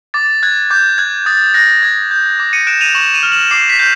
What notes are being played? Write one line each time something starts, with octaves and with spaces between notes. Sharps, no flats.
D6 A6
F#6 G#6
D6 G6
F#6 G#6
D#6 A6
F#6 A#6
D#6 G#6
G6
D6
C#7 D#7
F#6 D7 E7
D#7 F7
C#6 E7 F#7
D#7 F7
F6
E7 F#7
D6 C7
B6
G6